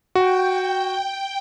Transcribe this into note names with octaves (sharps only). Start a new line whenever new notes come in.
F#4 G5